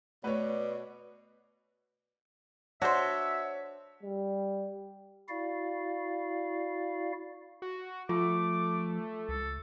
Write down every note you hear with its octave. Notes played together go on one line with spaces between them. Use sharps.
B2 A3 B4 C#5 D5
D4 F#4 C5 C#5 E5 C6
G3
E4 F#4 D5 F5
F#4
F3 A3 F4 D6
C#2 A4